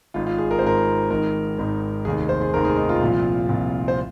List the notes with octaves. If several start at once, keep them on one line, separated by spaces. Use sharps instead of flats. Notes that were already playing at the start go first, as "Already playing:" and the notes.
G#1 G#2 D#3 F4
F4
G#4
A#4
C5
G#1 G#2 D#3 A#4
G#1 G#2 D#3 A#4
G#1 G#2 D#3
F1 D#2 D#3 G#4
C5
G#4
F1 D#2 D#3 A#4
G#4
D#4
F4
C2 A#2 F3
C2 A#2 F3
C5